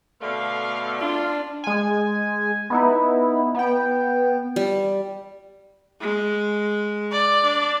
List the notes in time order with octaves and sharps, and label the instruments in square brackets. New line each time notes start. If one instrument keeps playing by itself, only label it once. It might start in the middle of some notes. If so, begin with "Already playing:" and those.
[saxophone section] B2 D3 A3 [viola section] F5
[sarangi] D4 [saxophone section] F4
[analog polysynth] G#3 G#5
B3 D#4 E4
B3 G5
[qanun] G3
[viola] G#3
[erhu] D5
[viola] D4